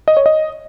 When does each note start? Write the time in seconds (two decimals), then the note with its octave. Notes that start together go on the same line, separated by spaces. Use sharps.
0.08 D#5
0.17 C#5
0.26 D#5